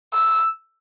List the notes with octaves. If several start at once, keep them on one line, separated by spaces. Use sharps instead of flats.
E6